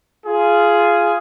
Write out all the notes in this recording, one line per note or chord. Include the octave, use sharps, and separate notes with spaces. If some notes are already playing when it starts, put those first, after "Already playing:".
F4 G#4